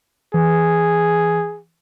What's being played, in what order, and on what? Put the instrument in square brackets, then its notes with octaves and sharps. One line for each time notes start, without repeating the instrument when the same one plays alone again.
[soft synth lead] E3 [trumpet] G#4